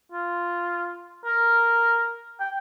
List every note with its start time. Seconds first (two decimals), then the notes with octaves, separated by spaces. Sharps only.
0.12 F4
1.25 A#4
2.40 G5